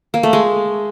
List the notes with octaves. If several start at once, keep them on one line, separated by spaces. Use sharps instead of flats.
A#3
A3
G#3